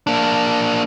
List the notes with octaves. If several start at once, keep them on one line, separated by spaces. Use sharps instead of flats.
A#3 D4